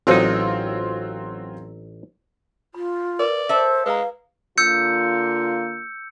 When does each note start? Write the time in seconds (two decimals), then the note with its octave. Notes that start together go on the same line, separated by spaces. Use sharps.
0.07 A1 F#3 C4 D#4 F4
2.74 F4 B5
3.19 A#4 B4 D5
3.49 A4 C5 E5
3.86 G#3 B4 F5 A#5
4.58 D3 A#3 F4 E6 G6 C#7